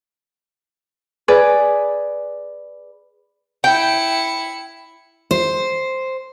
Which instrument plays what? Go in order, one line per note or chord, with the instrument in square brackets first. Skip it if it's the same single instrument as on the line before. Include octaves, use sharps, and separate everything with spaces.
[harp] G#4 B4 D5
[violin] E4 C#7 [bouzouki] G5
[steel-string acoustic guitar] C5